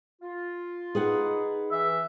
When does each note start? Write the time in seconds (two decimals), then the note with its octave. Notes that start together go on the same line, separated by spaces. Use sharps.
0.22 F4
0.95 D#4 G#4 B4 F#5
1.72 E3 E5